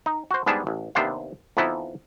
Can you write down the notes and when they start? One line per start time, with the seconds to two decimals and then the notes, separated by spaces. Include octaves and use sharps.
0.06 D#4
0.31 F#4 C5
0.46 G#2 G3 B3 D4 G#4 A5
0.67 A1
0.95 D#2 C3 B3 D4 C5 F5
1.57 F2 E3 F3 B3 D#4 E4